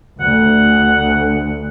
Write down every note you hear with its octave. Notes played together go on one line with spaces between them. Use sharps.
D2 F#5